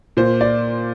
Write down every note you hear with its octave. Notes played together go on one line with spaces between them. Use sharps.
A#2 C5
D5